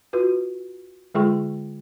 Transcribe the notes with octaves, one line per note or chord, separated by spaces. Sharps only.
F4 F#4 B4
D3 G#3 F4 G#4 G5 C#6